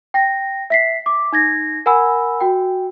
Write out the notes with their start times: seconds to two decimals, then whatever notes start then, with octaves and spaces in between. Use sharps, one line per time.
0.14 G5 A#6
0.70 E5 B6 C7
1.06 D6
1.32 D#4 G#6 A#6
1.86 A#4 F#5 G#5 B5 E6
2.40 F#4 G5